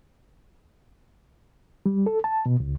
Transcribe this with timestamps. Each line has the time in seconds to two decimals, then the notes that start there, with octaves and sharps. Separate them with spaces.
1.86 G3
2.06 A4
2.24 A5
2.46 B2
2.60 C#2